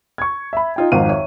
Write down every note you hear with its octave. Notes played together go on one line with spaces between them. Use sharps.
C#6 G#6
E5 B5
D#4 F4 G5
G#1 F2 D#3 F5 D#7
C#5 E5